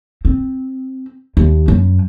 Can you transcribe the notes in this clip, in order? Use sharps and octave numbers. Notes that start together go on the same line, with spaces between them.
C4
D#2
F#2